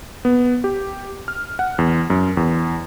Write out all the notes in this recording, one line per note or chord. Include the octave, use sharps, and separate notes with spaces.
B3
G4
F6
F#5
E2
F#2
E2